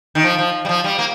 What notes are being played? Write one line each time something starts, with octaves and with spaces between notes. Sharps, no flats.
D#3
F3
F3
G3
F3
G3
A#3